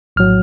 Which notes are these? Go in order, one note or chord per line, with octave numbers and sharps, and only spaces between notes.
A#1 A2 F#3 F6